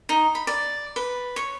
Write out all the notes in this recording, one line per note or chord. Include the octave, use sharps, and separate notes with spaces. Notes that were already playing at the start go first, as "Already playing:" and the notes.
D#4
B5
D5
B4
C#5